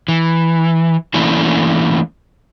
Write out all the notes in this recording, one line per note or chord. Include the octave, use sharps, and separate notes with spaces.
E3
E3 A3 A#3 C#4 D4 E4